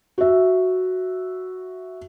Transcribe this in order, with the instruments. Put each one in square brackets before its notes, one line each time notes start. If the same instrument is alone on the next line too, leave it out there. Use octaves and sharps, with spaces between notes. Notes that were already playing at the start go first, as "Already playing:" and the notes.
[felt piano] F#4 E5